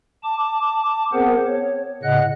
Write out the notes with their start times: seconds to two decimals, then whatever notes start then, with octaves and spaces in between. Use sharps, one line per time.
0.24 A5 D6
1.13 B3 C4 G#4 A#4 C5 F#5
1.47 C#5
2.03 A2 C#3 D#5 F#5 F#6